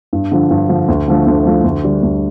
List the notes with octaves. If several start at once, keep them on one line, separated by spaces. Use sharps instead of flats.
G2
D3 F3
G2
D3 F3
D2
D3 F3 A3
D2
D3 F3 A3
D2
D3 G3 D4
D2